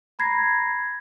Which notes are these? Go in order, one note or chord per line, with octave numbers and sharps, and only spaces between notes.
A#5 B5 G#6 A#6 C7